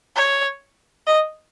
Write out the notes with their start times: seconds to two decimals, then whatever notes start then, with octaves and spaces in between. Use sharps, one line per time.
0.16 C#5
1.07 D#5